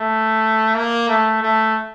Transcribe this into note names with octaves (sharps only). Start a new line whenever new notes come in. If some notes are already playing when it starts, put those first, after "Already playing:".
Already playing: A3
A#3
A3
A3